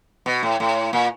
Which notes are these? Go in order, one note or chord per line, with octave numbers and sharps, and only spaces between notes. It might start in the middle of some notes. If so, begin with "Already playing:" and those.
B2
A2
A2
A#2